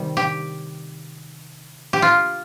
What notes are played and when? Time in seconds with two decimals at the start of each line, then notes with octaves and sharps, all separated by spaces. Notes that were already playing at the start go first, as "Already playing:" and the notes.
Already playing: C3 D#3 G3
0.17 G4
1.93 G4
2.02 F4